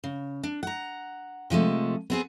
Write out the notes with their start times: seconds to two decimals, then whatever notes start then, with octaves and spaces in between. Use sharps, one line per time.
0.04 C#3
0.43 D4
0.63 F#5 A#5
1.50 C3 F3 G#3 A3
2.10 B3 C4 G#4